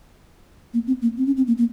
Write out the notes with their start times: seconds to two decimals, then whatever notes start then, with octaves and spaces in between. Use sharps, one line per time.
0.74 A#3
0.87 C4
1.02 A#3
1.18 C4
1.27 C#4
1.37 C4
1.47 A#3
1.58 A#3